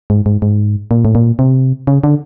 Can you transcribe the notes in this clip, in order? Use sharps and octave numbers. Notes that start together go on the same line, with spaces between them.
G#2
G#2
G#2
A#2
A2
A#2
C3
C#3
D3